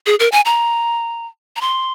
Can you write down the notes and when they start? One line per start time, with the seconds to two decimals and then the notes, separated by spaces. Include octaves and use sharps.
0.06 G#4
0.20 A#4
0.32 G#5
0.45 A#5
1.56 A#5
1.61 C6